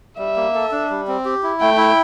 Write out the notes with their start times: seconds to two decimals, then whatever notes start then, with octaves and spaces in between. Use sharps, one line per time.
0.18 G3 E5
0.36 A#3
0.54 A4
0.72 D4
0.90 G3
1.07 C4
1.25 G4
1.43 E4
1.60 A3 G5
1.78 E4